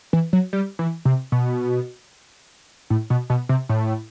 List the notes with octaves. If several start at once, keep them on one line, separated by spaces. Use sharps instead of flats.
E3
F#3
G3
E3
C3
B2
A2
B2
B2
C3
A2